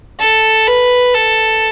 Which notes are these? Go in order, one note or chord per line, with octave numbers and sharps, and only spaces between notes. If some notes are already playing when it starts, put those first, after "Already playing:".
A4
B4
A4